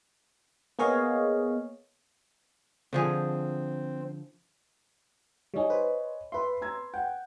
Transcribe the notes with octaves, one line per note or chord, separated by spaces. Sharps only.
A#3 B3 G#4 C#5 D#5 F5
D3 F3 C4 G#4
G3 D#4 C#5 D#5 G#5
B4 C5
B4 E5 B5 C6
A#5 E6 G#6
F#5 G5